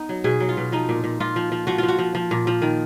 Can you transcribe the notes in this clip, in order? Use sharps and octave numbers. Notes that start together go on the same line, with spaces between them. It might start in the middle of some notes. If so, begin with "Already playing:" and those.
Already playing: B3 D#4
F#3
B2 G#4
F#3
F4
B2
F3 D#4
A#2
A#2
A#2 F4
F3
F3
F3 F#4
F3 F4
F#4
F3
F3
A#2
F3
D#3